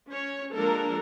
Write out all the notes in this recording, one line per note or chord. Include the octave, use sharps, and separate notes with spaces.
C#4 C#5
F3 G#3 A#3 D4 A4 A#4